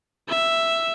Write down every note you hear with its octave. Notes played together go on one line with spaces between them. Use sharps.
E5